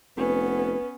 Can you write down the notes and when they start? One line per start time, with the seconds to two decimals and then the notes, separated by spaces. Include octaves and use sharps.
0.17 F1 B3 C#4 B4